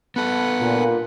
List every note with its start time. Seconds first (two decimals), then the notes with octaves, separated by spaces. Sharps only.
0.16 B3 A4 B4 F#5
0.60 A#2